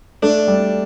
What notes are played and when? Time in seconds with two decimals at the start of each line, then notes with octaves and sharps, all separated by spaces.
0.22 A3 D4
0.48 G3